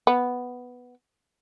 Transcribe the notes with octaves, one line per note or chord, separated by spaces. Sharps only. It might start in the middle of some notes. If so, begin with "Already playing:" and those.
B3